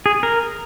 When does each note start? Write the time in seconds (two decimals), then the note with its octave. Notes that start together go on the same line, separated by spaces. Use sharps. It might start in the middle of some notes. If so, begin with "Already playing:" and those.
0.06 G#4
0.23 A#4